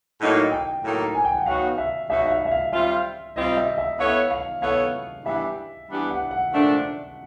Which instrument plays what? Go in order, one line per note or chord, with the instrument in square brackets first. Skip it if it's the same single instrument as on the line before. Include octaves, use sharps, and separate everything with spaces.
[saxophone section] A2 F#3 A#3 D#4
[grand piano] G5
[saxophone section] A2 F#3 A#3 D#4
[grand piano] G#5
G5
F#5
[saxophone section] B2 F#3 B3 D#4 F#4 [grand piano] F5
[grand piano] E5
[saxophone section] B2 F#3 B3 D#4 F#4 [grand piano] E5
[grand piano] E5
F5
E5
F5
[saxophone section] G3 C4 F4 [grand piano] E5
[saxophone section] G3 C4 F4 [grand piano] D#5
[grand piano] E5
E5
[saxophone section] B3 E4 A4 C#5 [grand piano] F5
[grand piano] F5
[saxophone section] B3 E4 A4 C#5 [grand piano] F5
[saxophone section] E3 G3 B3 D4 G4 [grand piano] E5
[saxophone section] E3 G3 B3 D4 G4
[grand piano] F#5
F#5
[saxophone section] A#2 F3 A3 D4